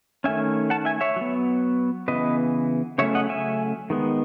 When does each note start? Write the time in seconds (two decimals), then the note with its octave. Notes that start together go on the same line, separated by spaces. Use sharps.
0.24 D#3 A3 C#4 E5 G#5
0.70 F#5 A5
0.85 E5 G#5
1.01 C#5 E5
1.16 F#3 B3
2.08 C#3 E3 B3 B4 D#5
2.98 C#3 F#3 A3 C#4 C#5 E5
3.15 D#5 F#5
3.29 E5 G#5
3.90 D#3 G#3 B3